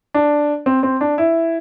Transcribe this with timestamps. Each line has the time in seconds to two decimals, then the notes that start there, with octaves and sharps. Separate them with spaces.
0.14 D4
0.66 C4
0.83 C4
1.01 D4
1.18 E4